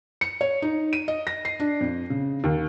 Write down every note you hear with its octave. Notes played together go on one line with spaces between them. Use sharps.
C#7
C#5
D#4
D#7
D#5
A#6
C7
D4
F2
C#3
D#2